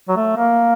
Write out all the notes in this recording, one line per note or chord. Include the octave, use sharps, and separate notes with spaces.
F#3
A3
A#3